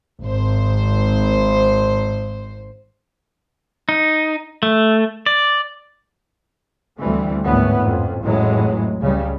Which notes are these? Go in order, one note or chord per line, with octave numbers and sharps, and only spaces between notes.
G#1 C5
D#4
A3
D5
D2 E3 G3 A3 C4
G#1 D2 A2 E3 B3 C#4
F2
A1 F2 A2 E3 F#3 G#3
C#2 C#3 G3